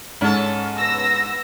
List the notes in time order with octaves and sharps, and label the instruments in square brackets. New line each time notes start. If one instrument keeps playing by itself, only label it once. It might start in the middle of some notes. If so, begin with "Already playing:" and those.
[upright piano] G#2 [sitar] C#4 A4
[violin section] B3 E6 A#6